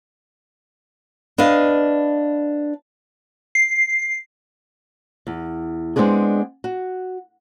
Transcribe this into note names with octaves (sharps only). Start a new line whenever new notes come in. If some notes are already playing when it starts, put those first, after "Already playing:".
D4 B4 D#5 F5
C7
E2
G#3 B3 C4 D4 G#4
F#4